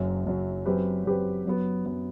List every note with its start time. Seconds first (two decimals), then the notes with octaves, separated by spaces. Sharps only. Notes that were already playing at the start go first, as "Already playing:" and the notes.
Already playing: F#1 F#2 F#3
0.25 F#1 F#2 F#3
0.66 F#2 F#3 C4 G4 B4
1.05 F#2 F#3 C4 G4 B4
1.45 F#2 F#3 B3
1.85 F#2 F#3 B3